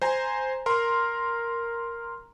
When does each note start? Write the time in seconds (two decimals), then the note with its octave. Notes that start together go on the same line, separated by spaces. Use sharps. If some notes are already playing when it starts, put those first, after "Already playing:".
0.02 C5 G#5 A#5
0.66 A#4 A#5 C6